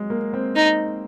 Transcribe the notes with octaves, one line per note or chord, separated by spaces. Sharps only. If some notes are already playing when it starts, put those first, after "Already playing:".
Already playing: F#3 G#3
A#3
C4
D#4